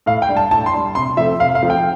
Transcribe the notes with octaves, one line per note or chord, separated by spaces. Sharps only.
A2 F5
G5
G3 D4
A5
A2 A5
C6
G3 D4
C3 C6
F3 A3 C4 E5
C3 F5
F5
F3 A3 C4
G5